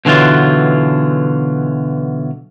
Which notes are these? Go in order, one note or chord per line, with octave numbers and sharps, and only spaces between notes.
B1 D3 E3 F#3 F4